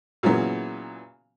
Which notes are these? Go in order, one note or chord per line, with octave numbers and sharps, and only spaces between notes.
A#2 C#3 E3 F#3 B3